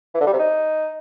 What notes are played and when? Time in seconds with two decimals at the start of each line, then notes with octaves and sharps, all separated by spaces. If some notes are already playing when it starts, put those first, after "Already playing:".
0.14 E3
0.21 D3
0.27 G3
0.33 C3
0.39 D#4